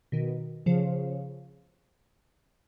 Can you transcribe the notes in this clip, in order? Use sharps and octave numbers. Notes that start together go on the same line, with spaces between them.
B2 D#3
C#3 F3